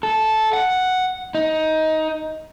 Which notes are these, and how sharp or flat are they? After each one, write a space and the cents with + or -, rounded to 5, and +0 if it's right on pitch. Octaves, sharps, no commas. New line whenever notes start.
A4 -10
F#5 +0
D#4 +15